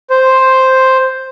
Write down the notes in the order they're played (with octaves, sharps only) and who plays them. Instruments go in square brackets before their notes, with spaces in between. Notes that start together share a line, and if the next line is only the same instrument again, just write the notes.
[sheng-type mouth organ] C5